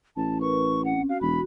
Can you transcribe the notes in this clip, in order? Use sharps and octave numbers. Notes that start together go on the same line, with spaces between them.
A1 A5
A#4 B4 C#6
C4 C#4 F#5
F#4 F5
E1 F#4 B5